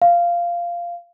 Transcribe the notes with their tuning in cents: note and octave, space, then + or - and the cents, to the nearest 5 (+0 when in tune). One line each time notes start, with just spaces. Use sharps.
F5 -10